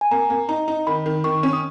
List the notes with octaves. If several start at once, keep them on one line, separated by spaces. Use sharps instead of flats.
G#5
A#3 A#5
A#3
D#4 A#5
D#4
D#3 B5
D#3
D#3 C#6
C#4
D#6